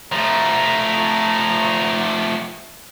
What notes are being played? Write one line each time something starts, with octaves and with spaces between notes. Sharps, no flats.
F3 A3 A#5